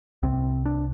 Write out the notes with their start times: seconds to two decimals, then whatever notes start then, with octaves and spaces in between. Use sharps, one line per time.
0.23 C2 C3 C4
0.65 D4